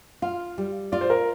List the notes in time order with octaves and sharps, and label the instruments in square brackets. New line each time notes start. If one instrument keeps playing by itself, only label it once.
[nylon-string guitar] F4 [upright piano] F5
[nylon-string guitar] G3
[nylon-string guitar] F4 [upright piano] D5
[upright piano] C5
A#4